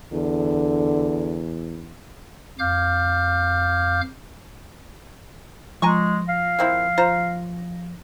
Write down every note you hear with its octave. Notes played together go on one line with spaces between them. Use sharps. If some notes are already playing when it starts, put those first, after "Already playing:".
E2 D3
F2 F5 D6 F6 G6
F3 G#3 G#5 A#5 C#6 A#6
F5
A#3 C4 E4
F4 C5 A#5